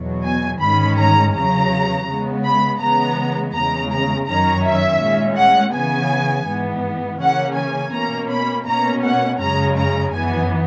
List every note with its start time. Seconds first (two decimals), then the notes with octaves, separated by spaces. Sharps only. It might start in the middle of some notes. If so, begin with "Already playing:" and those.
Already playing: E2 B2 F#3
0.24 G#5
0.61 G#2 D#3 G#3 C#4 B5
0.99 A#5
1.34 E2 C#3 F#3 A#5
2.08 C#3 G#3 B3
2.44 B5
2.81 C#3 E3 G#3 B3 A#5
3.54 E2 C#3 G#3 A#5
3.91 A#5
4.27 F#2 D#3 F#3 C#4 A#5
4.65 E5
5.01 A#2 G#3 C#4
5.37 F#5
5.74 C#3 E3 B3 G#5
6.48 G#2 E3 B3
7.21 C#3 E3 A#3 C#4 F#5
7.57 G#5
7.93 B2 A#3 C#4 A#5
8.30 B5
8.67 B2 A#3 C#4 A#5
9.04 F#5
9.41 F#2 C#3 G#3 C#4 A#5
9.78 A#5
10.13 F#2 E3 B3 G#5